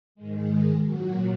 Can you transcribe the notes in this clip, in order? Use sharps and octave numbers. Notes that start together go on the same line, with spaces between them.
G#2 D#3 G#3
A#2 F#3 F#4